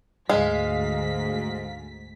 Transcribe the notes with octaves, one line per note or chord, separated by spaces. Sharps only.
D2 G#2 G#3 F5 B6